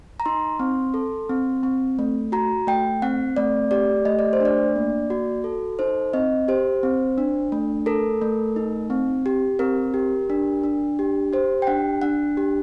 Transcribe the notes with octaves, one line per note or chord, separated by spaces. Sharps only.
A#5
D#4 C6
C4
A4
C4
C4
A3
F#4 A#5
A3 G5
C4 F#5
A3 D5
G4 D5
A3 D#5
D5
C5
D4
D5
A#3
F#4
A4
D#4 C5
C4 D#5
G4 C5
C4
D4
A3
A4 A#4
A3
D#4
C4
G4
C4 A#4
G4
D4
D4
G4
G4 C5
G5
D4 F#5
D4 F#5
G4